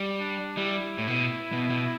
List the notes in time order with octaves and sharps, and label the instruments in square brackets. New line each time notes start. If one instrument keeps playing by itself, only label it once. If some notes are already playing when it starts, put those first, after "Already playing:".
Already playing: [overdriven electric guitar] G3
[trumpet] D4
[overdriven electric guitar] G3 [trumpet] E4
[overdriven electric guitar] A2
B2
B2
B2